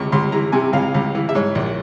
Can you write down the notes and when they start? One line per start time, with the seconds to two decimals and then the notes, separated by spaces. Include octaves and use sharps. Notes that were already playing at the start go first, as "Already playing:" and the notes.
Already playing: C#2 C3 C#6
0.12 C#2 C6
0.32 E3 A#5
0.52 C3 G#5
0.73 C#2 F5
0.94 C#2
1.15 E3
1.29 E5
1.35 G#2 C#5
1.55 A#1